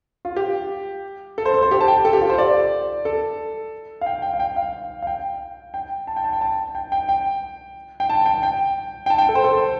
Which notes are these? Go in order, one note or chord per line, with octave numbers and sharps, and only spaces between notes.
F4
G4
A4
C5
A4
C5
G4
A5
G5
A4
G4
F4
C5
D5
A4
F5
G5
G5
F5
G5
F5
F5
G5
G5
A5
G5
A5
G5
A5
G5
G5
G5
G5
A5
G5
G5
G5
A5
G5
A4
C5
A4